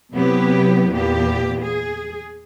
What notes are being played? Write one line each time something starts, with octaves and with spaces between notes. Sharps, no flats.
C3 F#3 B3 E4 G4 B4
E2 A#2 B3 G4
G#4